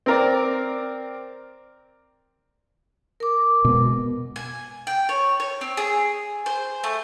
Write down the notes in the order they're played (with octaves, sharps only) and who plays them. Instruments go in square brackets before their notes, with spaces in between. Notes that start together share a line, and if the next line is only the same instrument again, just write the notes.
[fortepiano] C4 A#4 D5
[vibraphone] A#4 D6
[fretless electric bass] B2 G#3 B3
[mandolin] G#5
G5
C#5
C#5
C4
G#4
C5
A3